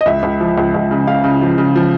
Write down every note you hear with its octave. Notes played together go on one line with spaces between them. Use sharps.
D#5
C#2 E5
C#2
F3
C#2
C#2
C#3
C#3 F5
C#3
F3
C#3
F3